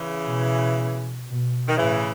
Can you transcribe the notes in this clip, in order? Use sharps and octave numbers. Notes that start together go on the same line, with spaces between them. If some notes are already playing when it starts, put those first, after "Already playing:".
Already playing: C#3 E3
B2
B2
D#3
A2 C#3 E3